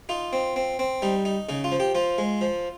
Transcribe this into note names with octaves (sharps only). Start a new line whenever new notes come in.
D#4 F4
C4
C4
C4
G3 D#4
D#4
C#3 D#4
F4
F3
G4
F3 F4
G#3
F3